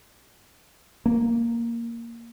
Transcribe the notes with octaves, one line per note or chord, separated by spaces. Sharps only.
A#3